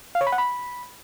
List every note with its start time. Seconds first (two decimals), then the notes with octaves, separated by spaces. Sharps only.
0.15 F5
0.21 C#5
0.27 B5
0.32 F#5
0.38 B5